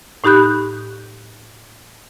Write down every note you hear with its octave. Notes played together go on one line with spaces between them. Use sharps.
A2 D#4 G4 B5 F#6 G6